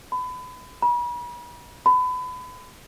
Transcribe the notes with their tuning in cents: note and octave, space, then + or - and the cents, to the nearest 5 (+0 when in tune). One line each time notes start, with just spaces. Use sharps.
B5 +30
B5 -40
B5 +30